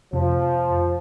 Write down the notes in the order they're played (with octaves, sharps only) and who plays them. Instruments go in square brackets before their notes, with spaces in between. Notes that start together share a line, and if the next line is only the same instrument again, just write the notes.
[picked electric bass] F2 C3 [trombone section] F3